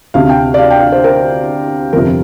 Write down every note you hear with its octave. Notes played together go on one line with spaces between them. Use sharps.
D2 C3 F5
G5
D5
F5
G5
F5
C5
A#4
G1 F2 C3 A#4